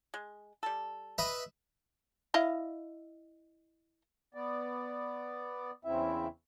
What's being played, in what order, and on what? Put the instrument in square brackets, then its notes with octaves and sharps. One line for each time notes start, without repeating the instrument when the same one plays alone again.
[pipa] G#3
G3 A4
[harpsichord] B4 D#5 E5
[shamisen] E4 D#5 F5
[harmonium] B3 D5
E2 C#3 C4 E4 E5